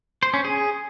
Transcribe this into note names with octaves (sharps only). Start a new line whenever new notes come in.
C5
C#4
G#4